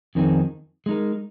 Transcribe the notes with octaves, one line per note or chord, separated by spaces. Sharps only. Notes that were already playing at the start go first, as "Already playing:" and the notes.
F2 D#3 C4 D#4 G#4
G#3 D#4 A#4